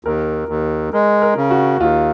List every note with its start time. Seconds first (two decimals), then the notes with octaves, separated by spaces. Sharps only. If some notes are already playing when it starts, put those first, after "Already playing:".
0.04 D#2 A#4
0.49 D#2
0.93 G#3 A#4
1.22 A#4
1.36 C#3
1.50 F#4
1.80 D#2 F4